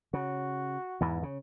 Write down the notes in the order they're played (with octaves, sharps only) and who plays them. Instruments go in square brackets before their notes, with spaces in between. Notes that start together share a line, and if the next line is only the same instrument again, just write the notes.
[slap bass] C#3 [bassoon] F#4
[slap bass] E2 G#2 E3
C#3